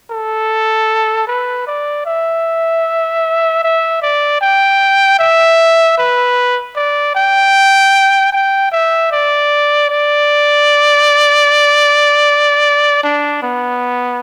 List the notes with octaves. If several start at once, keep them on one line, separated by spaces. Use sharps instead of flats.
A4
B4
D5
E5
E5
D5
G5
E5
B4
D5
G5
G5
E5
D5
D5
D4
B3